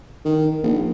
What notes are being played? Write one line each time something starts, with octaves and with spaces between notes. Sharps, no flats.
D#3
A#1